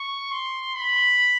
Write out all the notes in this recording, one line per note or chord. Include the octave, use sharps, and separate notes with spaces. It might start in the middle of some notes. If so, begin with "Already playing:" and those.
Already playing: C#6
C6
B5